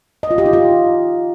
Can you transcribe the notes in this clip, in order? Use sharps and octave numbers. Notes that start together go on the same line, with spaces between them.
D#5
F4
G4
D#4
F4